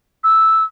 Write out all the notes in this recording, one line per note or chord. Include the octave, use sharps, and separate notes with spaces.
E6